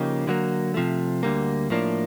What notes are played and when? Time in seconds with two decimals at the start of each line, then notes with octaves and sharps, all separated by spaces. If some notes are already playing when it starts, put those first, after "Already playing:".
Already playing: C#3 F3 A#3 D#4 G4
0.27 D3 F#3 A#3
0.74 C3 F3 A3
1.23 D2 D3 G3 A#3
1.70 A2 F3 A#3 D4